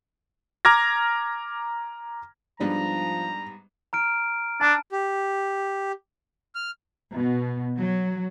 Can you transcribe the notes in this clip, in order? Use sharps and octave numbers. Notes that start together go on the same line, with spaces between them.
A#5 D6 F6 G#6 A#6
G#2 F3 G3 B3 D4 A#5
A#5 F6 D7
D4 A5
G4
F6
B2
F#3